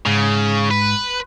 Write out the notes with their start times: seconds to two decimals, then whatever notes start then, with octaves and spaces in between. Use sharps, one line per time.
0.06 G#2 C#3
0.71 B4